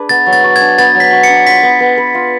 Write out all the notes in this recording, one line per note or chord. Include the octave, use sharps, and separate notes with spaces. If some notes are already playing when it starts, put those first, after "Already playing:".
Already playing: D4 G#4 B4
B3 A6
F#3
A6
F#4
D4 G#6
B3 A6
F#3
B6
F#4
C#7
D4
F4 B6
B3
B3
B4
F4